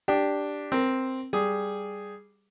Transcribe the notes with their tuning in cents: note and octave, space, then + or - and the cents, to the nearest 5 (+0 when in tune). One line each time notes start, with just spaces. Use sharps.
D4 +0 G4 +0
C4 +0 A#4 +10
G3 +0 G#4 +0